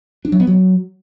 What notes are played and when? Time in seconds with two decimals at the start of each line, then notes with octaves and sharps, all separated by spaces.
0.25 D4
0.32 F#3
0.40 B3
0.47 F#3